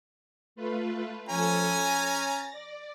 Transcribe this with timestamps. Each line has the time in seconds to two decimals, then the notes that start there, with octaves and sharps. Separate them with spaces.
0.56 A3 F4 B4
1.29 F3 C#4 A4 G#5 A#5
1.88 A6 A#6
2.52 D5